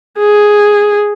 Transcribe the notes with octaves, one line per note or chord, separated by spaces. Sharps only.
G#4